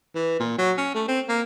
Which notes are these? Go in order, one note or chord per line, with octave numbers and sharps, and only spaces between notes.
E3
A#2
F#3
C#4
A3
C4
A#3